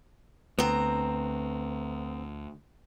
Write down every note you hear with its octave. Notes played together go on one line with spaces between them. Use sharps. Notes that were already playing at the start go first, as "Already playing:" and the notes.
D2 B3 C4 A#5